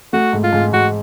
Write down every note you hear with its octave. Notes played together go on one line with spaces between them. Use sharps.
A3 F#4
G#2
F4
G#2
G#2 F#4